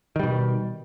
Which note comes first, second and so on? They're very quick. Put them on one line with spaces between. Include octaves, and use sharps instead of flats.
D#3 G3 B2